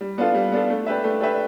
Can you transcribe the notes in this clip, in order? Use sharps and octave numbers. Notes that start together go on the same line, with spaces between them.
G3
B3 D4 F4 A4
G3
B3 D4 F4 A4
A3
D4 G4 B4 E5
A3
D4 G4 B4 E5